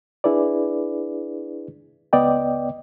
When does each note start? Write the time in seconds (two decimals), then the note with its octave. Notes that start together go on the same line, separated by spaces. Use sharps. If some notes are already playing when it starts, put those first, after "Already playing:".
0.24 D4 E4 G#4 B4 D5
2.13 C#2 B3 D5 D#5 G5